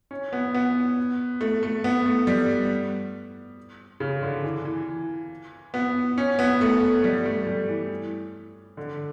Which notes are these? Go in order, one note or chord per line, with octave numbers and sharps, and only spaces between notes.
C#4
B3
B3
A3
A3
B3
A3
G3
C#3
D3
E3
E3
B3
C#4
B3
A3
G3
A3
G3
E3
D3